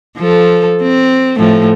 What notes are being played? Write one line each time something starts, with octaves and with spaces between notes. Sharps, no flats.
F3 A4
C4
A2 F3 A3